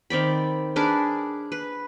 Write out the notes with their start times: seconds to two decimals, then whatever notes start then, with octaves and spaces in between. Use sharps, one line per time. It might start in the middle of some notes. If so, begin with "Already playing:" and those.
0.10 D#3 C4 D5 B5
0.76 D4 G#4 A#4 B4
1.52 B4